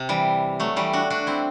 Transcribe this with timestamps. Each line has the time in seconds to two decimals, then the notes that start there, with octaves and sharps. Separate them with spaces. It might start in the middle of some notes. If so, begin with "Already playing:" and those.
Already playing: C3
0.09 E3 G3
0.60 F#3 A3
0.76 E3 G3
0.93 D4 F#4
1.10 D4 F#4
1.27 C4 E4